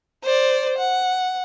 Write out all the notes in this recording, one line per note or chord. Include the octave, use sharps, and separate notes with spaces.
C5 D5
F#5